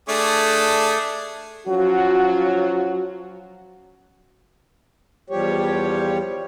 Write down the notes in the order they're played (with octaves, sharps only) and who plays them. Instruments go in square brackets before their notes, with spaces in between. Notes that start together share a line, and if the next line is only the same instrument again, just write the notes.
[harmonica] A3 D4 G#4
[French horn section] F3 F#3 C#4 F4 F#4
[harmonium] E2 F3 G3 G4 C#5